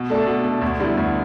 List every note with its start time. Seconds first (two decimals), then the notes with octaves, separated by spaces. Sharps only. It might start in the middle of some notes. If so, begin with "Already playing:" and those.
Already playing: B2
0.10 A3 D4 A4
0.27 B2
0.44 A3 D4 A4
0.61 D2
0.80 D3 G3 B3 E4
0.97 D2